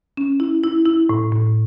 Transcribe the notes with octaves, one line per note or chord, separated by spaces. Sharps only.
C#4
E4
E4
E4
A2
A2